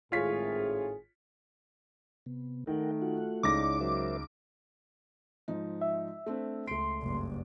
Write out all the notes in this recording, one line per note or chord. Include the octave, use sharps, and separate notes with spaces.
G#1 A2 F4 G#4 C#5 B6
C3 B3
D#3 A3 A#4 F#5 G5
F4 F#4 F#5
C#2 D#4 E4 C#5 D5 D6 A#6
F#3 A#4 C5 E5
G#2 F3 D#4
E5
A3 C4 D4
C#2 A3 C6 D7
F#1 G2